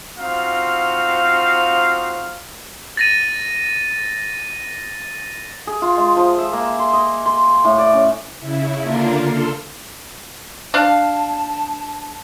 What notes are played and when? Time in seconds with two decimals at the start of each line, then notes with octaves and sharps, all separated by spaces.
0.15 C4 D#4 F4 F#4 F5
2.97 A6 A#6 D#7
5.67 G#4
5.82 F4
5.97 G#3
6.17 F3
6.38 E5
6.53 A#3
6.79 C6
6.93 D#5
7.26 C6
7.65 A2
7.78 D5
7.93 C#4
8.40 C#3 E4
8.82 D3 A#3 D4 F4 A#4
9.21 A4 C6
10.74 D4 F5 A5